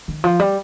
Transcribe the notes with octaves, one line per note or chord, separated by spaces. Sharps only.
D#3
F3
G3